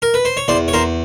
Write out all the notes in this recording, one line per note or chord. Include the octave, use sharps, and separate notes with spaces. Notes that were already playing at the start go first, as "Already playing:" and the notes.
A#4
B4
C5
C#5
E2 C5 D5
C#5
E2 A#4 C5